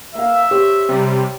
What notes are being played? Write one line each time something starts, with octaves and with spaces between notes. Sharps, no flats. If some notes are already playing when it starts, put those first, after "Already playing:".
A#3 E5 F5
G4 C5 C#5
C3 G3